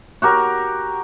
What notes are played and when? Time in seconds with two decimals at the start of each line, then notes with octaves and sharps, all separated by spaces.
0.22 F#4 G4 A#4